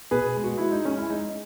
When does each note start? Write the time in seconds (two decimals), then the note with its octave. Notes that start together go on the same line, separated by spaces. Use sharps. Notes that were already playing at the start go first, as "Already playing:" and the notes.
0.11 B2 G#4 B4
0.37 G#3
0.44 F#4
0.58 G#3 E4
0.72 D#4
0.85 G#3 C#4
0.98 E4
1.10 G#3 D#4